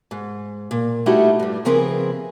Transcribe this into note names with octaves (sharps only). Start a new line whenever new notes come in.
G#2
A#2
G3 A3 D#4 E4 F#4 G4
G2 G3
C#3 F3 C4 G#4 A#4 B4